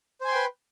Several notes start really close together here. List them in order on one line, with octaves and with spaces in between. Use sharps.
C5 G#5 C6 G5 B4